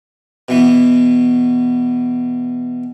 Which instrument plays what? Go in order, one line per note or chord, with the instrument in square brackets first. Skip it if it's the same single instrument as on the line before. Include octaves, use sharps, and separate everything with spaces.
[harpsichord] B2 E3 B3